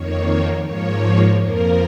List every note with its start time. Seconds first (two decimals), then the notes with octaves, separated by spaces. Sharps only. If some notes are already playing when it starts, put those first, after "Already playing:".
Already playing: F2 D#3 A#3 C#5
0.65 G#2 F3 A#3 C#5
1.41 F2 F3 A#3 A#4